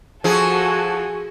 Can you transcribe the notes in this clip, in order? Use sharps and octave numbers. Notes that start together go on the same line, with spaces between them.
F3 F#4 G#4 A4 G#5